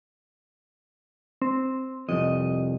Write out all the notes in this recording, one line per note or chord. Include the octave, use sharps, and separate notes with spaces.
C4
C2 F2 D#5